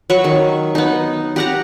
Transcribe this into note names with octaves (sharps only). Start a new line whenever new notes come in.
F#3 C#5 B5 C#6
D#3
B3 D#4
G4 F#5 A#5